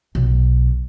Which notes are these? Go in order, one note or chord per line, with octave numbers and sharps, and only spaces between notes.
B1